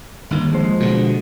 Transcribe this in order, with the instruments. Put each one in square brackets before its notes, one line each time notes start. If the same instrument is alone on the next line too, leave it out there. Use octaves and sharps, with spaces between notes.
[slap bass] G1 D#2
[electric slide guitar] F3 G#3 C5
[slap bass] B2 D3